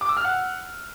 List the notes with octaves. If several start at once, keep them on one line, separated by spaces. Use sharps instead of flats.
D6
E6
F6
F#5